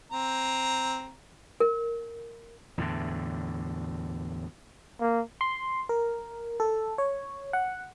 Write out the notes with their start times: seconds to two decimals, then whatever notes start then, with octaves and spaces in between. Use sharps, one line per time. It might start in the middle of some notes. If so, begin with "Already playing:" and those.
0.12 C4 A#5
1.60 A#4
2.78 E2 A2 D3
5.01 A#3
5.41 C6
5.89 A#4
6.60 A4
6.98 C#5
7.53 F#5